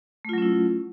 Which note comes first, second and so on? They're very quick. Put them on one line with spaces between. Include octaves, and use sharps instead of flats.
A3 F4 F#3 C#4 E4